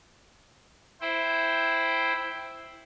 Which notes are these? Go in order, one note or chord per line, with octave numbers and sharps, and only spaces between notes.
E4 C5 G5